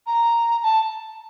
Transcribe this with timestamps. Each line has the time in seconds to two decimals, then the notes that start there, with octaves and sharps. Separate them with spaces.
0.07 A#5
0.63 A5